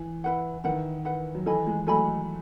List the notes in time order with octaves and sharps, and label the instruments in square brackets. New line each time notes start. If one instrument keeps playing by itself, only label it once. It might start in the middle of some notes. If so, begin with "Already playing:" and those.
Already playing: [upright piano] E3
[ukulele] E4 B4 F#5
[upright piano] D#3 [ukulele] E4 B4 F#5
[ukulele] E4 B4 F#5
[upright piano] F#3
[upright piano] E3 [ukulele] A4 D#5 G#5 B5
[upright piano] E3 G#3
[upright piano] F#3 A3 [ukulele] A4 D#5 G#5 B5